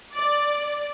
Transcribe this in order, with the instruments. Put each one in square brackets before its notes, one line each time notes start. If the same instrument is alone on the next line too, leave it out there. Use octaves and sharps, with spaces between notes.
[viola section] D5